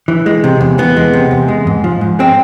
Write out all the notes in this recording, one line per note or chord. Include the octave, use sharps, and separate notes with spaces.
E3
G#3
C3
E2
E3 B3
G#3
C3
E2
G#3
G#2
F3
G#2
G#3 C4